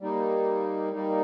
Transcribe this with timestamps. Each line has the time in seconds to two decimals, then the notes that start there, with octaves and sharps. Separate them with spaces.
0.01 G3 A#3 D#4
0.93 G3 A#3 D#4